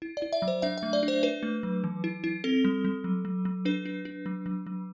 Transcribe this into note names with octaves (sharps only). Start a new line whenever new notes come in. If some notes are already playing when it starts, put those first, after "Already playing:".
E4
D5
E4
E5
F#3
C5
D4 E5
E5
A3
D5
D4
C5
D4 B4
A3
F#3
E3
E4
E4
C4 A4
G3
G3
F#3
F#3
F#3
D4 B4
D4
D4
F#3
F#3
F#3